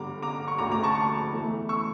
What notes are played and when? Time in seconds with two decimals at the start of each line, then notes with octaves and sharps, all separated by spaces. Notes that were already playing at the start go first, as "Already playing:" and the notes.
Already playing: G1 G2 D3 A#5 D6
0.23 A#5 D6
0.48 C#6
0.58 D2 D3 A3 A#5 D6
0.72 A#5 D6
0.83 A5 C#6
0.95 A5 C#6
1.32 E2 E3 A3
1.69 C#6 E6